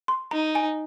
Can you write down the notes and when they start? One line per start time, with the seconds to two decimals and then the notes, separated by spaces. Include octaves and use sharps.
0.08 C6
0.31 D#4 A#5
0.55 G#5